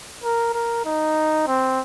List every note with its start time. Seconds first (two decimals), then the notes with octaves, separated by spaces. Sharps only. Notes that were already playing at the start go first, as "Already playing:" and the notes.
0.23 A#4
0.54 A#4
0.85 D#4
1.47 C4